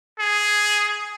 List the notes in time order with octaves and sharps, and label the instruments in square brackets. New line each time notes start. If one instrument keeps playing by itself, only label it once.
[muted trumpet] G#4